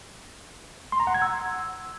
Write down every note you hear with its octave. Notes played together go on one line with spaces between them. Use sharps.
C6
A#5
F#5
G#6
E6